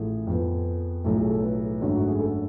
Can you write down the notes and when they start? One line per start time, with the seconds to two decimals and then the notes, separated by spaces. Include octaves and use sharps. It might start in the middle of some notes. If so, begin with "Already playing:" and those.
Already playing: A1 A2 F3 A3 G#4
0.27 F2 F3 B3
1.04 B1 A2 F3 A3
1.17 G#4
1.30 A4
1.42 B4
1.81 G#1 F#2 D3 F#3 A3
1.96 F#4
2.07 G#4
2.20 A4